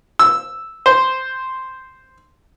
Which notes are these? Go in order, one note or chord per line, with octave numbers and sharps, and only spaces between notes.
E6
C5